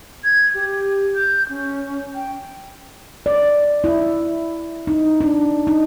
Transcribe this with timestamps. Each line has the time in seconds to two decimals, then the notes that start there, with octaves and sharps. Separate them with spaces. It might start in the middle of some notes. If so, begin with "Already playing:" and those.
0.24 G#6
0.55 G4
1.15 G6
1.49 C#4
2.15 G5
3.26 D5
3.84 E4
4.87 D#4
5.21 D4
5.67 D#4